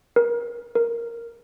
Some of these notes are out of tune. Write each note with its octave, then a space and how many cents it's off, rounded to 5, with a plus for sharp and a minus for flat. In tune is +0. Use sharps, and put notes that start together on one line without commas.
A#4 +30
A#4 +0